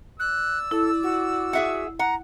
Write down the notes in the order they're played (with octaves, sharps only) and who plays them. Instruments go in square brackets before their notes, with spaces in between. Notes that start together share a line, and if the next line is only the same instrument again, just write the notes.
[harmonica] D5 E6 [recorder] F#6
[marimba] E4 [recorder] A4
[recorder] F#4
[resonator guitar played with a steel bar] G#4 E5 F#5
[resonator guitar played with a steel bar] F#5 [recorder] A#5